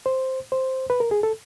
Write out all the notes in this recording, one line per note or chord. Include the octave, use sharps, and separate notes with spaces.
C5
C5
B4
A#4
G#4
A4